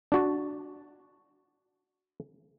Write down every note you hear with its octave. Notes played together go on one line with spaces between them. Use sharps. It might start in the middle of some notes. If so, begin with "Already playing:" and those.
D4 F#4 A5